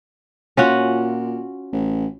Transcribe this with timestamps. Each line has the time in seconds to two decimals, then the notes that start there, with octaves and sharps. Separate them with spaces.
0.57 A#2 C#4 F4 F#4
1.73 A1